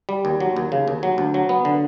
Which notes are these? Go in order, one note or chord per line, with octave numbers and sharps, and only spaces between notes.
G3
D#2
F#3
D#2
C#3
D#2
F#3
D2
F#3
B3
D3